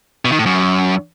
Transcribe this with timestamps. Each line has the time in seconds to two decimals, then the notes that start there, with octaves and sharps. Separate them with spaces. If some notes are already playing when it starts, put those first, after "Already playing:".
0.25 B2
0.32 D#3
0.39 A2
0.46 F#2